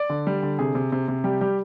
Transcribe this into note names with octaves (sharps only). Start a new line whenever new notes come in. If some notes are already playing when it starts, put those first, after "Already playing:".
Already playing: D5
D3
G3
D3
C3 G#4
C3
C3
C3
G3 G4
G3 G4